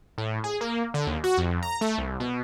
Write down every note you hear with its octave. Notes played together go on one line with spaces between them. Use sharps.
A2
G#4
A#3
D3
D#2
F#4
F2
A#5
A3
C2
B2